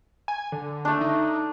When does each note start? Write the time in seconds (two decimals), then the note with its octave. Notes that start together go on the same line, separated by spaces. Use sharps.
0.28 G#5
0.52 D3
0.85 A3 D4
1.01 D#4